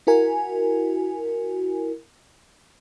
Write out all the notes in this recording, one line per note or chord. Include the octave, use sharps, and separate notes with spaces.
E4 F#4 A#4 G#5